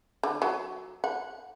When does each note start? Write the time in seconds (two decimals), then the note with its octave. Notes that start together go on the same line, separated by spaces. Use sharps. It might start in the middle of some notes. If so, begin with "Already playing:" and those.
0.23 D3
0.42 F#3
1.04 F#5